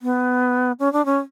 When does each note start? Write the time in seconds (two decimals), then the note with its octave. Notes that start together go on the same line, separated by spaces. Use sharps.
0.02 B3
0.79 C#4
0.93 D4
1.05 C#4